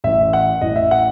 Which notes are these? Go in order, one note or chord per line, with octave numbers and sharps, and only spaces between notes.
A1 A2 E3 E5
F#5
A1 A2 E3 D#5
E5
F#5